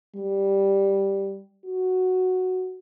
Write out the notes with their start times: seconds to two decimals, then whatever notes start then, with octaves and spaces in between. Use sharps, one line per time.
0.16 G3
1.65 F#4